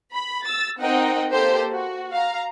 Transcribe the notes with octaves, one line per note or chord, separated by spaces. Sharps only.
B5
E6 A6
C4 D#4 A#4 D#5 F#5 G5
A#3 G4 A4 C5
F#4
F5 A#5